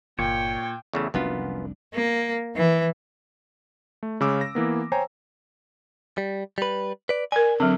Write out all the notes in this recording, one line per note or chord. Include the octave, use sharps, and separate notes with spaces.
G1 A#2 C#5 G5
E2 C#3 A3
F1 C2 F#2 B3 D4 F4
A#3
E3
A3
C#3 G#3 C#4 D6 E6
A#6
E3 A#3 B3
C5 C#5 G5 G#5 A#5
G3
G3 B4
B4 D5
A#4 D5 G#5
D3 F#3 C4